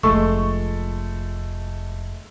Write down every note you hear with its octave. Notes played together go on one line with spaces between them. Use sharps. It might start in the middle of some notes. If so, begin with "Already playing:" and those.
F1 G#3 A3 F4 A4 C#6